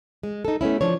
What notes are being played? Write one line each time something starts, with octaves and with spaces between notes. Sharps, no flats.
G#3
D#4 A4
A3 B3 C#4 E4
F3 D4 C#5